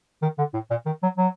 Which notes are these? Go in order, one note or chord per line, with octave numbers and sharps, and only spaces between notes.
D#3
D3
A2
A#2
D#3
F#3
F#3